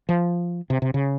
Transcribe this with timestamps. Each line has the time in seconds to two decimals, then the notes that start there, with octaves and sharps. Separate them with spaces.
0.09 F3
0.70 C3
0.82 C3
0.94 C#3